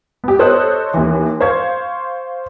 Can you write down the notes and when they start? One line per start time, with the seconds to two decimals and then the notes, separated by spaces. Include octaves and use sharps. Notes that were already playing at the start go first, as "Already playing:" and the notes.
0.24 B3 G4
0.39 A4 C5 C#5 D#5 D#6 F#6
0.94 D#2 E3
1.40 C5 F5 C6 C#6 G#6